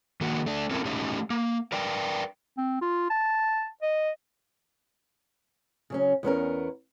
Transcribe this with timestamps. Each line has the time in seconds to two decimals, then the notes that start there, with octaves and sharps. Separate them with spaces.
0.21 D#3 A#3 F#4
0.46 A3 D4
0.71 C4 C#4 E4 A4 A#4
0.85 A3 C#4 D#4 G4 C#5
1.30 A#3
1.72 A#4 B4 D5 G5
2.57 C4
2.81 F4
3.10 A5
3.82 D#5
5.90 C#3 F#3 C#4
6.23 E2 B3 C#4 A#4